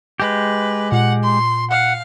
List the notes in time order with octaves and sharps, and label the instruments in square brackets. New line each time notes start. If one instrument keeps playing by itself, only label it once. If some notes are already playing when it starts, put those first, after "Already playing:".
[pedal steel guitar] G#3 G4 [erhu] B4
[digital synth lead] A#2 [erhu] F#5
[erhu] C6
[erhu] F5 [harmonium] F#5